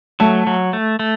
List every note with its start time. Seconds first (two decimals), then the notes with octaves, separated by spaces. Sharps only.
0.20 F#3 A3
0.47 F#3
0.73 A3
0.99 A3